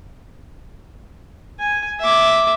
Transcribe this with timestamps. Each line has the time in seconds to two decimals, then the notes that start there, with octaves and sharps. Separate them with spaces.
1.60 G#5
2.00 E5 D6